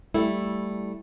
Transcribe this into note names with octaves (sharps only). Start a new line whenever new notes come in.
G3 A3 E4